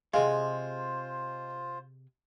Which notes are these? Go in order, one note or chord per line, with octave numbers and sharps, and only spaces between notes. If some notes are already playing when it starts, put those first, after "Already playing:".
C3 G#3 F4 G#4 C5 F5